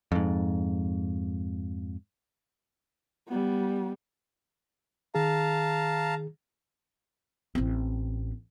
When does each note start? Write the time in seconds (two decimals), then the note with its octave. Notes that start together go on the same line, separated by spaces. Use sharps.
0.12 F2 G#2
3.28 G3 B3
5.15 D#3 G#4 F5 A5 A#5
7.55 A1 C4